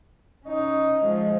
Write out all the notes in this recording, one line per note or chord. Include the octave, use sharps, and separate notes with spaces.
C#4 D#4
F3 G#3